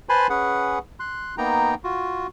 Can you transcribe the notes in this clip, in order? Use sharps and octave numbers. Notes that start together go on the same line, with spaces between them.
B4 C5 G#5 A5 B5 C6
C#4 G#4 B4 F#5
C6 F#6
A#3 B3 D#4 G5 A#5
F4 F#4